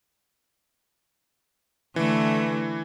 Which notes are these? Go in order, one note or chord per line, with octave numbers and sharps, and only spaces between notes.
D3 E3 A3